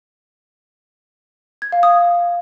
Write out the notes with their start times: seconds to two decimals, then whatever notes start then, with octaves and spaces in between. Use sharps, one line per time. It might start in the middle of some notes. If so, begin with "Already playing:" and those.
1.62 G#6
1.72 F5
1.83 D#6